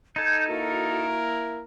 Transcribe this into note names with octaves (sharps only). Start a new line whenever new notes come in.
D#4 A4 G6 G#6
A#3 E4 F#4 A#4